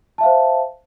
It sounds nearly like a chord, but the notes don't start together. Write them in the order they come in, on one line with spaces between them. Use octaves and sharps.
A5 E5 F5 C5